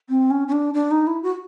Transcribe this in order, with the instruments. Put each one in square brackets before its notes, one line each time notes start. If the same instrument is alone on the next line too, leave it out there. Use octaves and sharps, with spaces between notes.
[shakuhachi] C4
C#4
C#4
D4
D4
D#4
E4
F#4